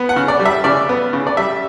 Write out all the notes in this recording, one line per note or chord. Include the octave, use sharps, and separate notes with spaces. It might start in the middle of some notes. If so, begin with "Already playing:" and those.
Already playing: B3
F#5
C#3
D5
G3
E5
C#3 D5
B3
C#3
D5
G3 E5